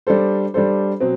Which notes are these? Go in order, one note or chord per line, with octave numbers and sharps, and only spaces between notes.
G3 D4 A4 C5
G3 D4 A4 C5
B2 F#3 C4